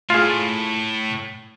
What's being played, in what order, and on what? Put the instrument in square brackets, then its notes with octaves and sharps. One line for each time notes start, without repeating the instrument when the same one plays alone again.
[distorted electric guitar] A2 [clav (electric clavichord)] F4 G#4